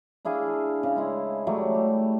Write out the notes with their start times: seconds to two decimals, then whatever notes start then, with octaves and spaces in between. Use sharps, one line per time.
0.25 D4 E4 G#4 F5
0.83 C#3
0.96 G#3 E4
1.47 F#3 G3 A3
1.74 G4